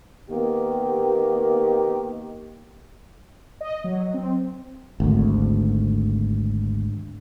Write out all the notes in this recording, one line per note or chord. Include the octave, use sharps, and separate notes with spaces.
D#3 A#3 B3 G4
D#5
F#3
C4
G#1 D2